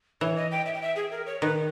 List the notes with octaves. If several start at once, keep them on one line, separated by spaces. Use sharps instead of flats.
E3 C#5
D#5
G5
E5
G5
E5
G#4
A#4
C#5
D#3 B4